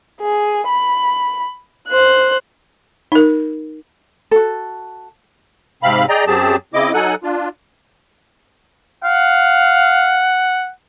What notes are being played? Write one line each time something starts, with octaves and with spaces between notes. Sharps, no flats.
G#4
B5
C5 F#6
D#4 A#4
F#4 A4
G#2 C3 C4 F5 B5
G#4 D5 D#5 G5 A#5
F#2 F#3 C4 G4 G#4 A5
C#3 C4 E4 D#5 D6
F#3 D#4 A4 F#5 G#5 F#6
D4 F4
F5 F#5